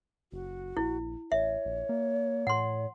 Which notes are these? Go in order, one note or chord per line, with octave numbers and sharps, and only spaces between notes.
F#1 F#4
A#1 E4
A1 C#5 E5
A#1
A#3
A2 F#5 C6